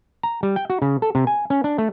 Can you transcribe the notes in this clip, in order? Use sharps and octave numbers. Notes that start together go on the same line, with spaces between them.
A#5
G3
G5
F#4
C#3
A4
C3
G#5
C#4
D4
A3